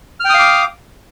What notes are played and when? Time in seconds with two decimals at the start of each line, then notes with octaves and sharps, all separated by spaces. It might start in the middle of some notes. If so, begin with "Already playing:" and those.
0.20 F6
0.25 G5
0.29 D#6
0.34 F5
0.39 D6